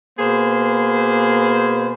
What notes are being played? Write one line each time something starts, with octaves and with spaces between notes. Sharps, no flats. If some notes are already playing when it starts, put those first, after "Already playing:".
B2 A#3 G#4 B4 C5